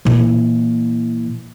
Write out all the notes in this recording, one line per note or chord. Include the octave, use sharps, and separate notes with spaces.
A#2 E3